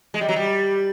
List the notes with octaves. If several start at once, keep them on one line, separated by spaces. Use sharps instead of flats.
G#3
G3
F#3
G3